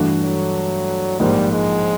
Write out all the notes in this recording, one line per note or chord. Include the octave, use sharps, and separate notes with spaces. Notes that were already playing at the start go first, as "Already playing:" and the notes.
Already playing: G2 E3 A3 D4 F#4
F#3
A#1 G#2 F3 G3 A#3
G#3